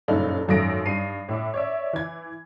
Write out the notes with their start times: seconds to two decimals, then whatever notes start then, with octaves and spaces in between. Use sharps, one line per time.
0.08 F#1 G2 A#2 C#3 D#4 A4
0.48 G#1 F#2 A3 D#6 A#6 D7
0.85 G2 C7 D#7
1.28 A2 E5 D6
1.54 C#5 D5 E5
1.93 E3 G#6